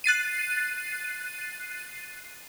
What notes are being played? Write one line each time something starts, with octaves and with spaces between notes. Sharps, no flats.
F#6 A6 C7 D#7